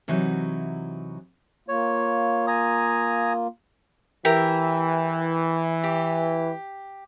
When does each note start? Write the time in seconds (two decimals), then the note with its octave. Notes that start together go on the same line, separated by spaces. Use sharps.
0.08 C3 E3 F#3 D#4 F#4
1.68 A#3 F4 C#5
2.47 G#5 A#5 D#6
4.25 E3 G4 A#4 E5
5.84 G4